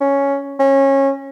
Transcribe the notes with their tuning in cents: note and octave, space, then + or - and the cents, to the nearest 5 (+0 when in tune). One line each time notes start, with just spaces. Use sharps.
C#4 +5
C#4 -20